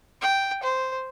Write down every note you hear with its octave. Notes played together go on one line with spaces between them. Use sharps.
G5
C5